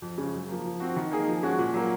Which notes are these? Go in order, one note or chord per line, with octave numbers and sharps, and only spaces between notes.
F2
C#3 G#3 C#4
F#2
F3 A#3
F3
C4 F#4
D#3
A#3 D#4 G#4
F3
G#3 C#4 F#4
A#2
F#3 A#3